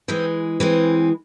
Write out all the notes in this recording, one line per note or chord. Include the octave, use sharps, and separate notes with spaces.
E3 G#3 C4
E3 G#3 C4